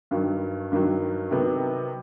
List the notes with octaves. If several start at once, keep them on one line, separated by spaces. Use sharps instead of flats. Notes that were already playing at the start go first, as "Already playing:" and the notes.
G2 D#3 F#3
G2 D#3 F#3
C3 D#3 F#3 B3